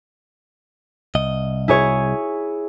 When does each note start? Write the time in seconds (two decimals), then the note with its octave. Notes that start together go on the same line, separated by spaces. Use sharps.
1.15 C2 D#5
1.68 E4 G#4 C#5